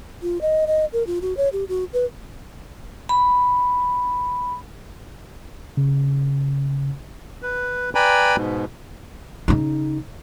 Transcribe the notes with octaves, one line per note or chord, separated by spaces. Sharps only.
F4
D#5
D#5
A#4
F4
F#4
C#5
G4
F#4
B4
B5
C#3
B4
B4 D5 G5 G#5 A#5 B5
G#2 B2
C#3 D#4